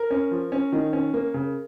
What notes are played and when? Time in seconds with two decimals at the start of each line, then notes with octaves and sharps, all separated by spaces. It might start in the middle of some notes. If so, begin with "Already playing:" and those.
Already playing: A#4
0.11 C#4
0.31 F3
0.52 C#4
0.73 D#3
0.93 C#4
1.14 A#3
1.34 C#3